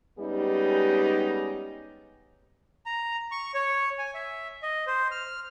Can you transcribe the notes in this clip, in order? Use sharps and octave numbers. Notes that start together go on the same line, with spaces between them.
G3 G#3 B3 C#4 D#4 G4
A#5
C#6
C#5
G#5
E5
D#5
C5
F6